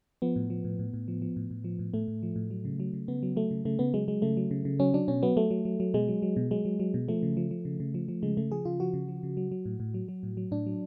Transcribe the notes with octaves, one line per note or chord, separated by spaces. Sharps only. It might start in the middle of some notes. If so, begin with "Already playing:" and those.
F3 B3
A2
F3
A2
A2
A2
F3
F3
A2
A2
F3
A2
A2 A3
A2
F3
A2
F#3
C#3
F#3
C#3
C#3 B3
F#3
F#3 A3
C#3
C#3 A3
C#3 B3
F#3 G#3
F#3 G#3
C#3 A3
F#3
C#3
C#3
F#3 C#4
F#3 D4
B2 C#4
F#3 B3
F#3 A3
F#3
F#3
F#3
B2 G#3
F#3
F#3
B2
F#3 G#3
F#3
F#3
B2
F3 A3
C#3
F3
F3
C#3
C#3
F3
F3
C#3 G#3
C#3 A3
F3 G#4
C#3 F4
F3 F#4
C#3
F3
C#3
F#3
F#3
A2
A2
F#3
F#3
A2
F#3
A2 D4
F#3